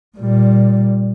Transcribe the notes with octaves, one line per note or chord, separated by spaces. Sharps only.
A#2 G3